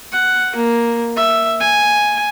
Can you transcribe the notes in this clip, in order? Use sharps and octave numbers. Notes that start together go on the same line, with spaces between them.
F#5
A#3
E5
G#5